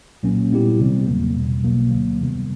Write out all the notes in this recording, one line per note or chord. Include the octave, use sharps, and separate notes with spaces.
C2 A#2 F#3 A#3 C#4
A#2 G3 B3 E4 G4
C2 C3 D#3 G3 C4
E2 C#3 F#3 A#3
E2 B2 G3
B1 B2 F#3 A#3
D2 D3 F#3 A#3
F2 C3 D#3 G3 B3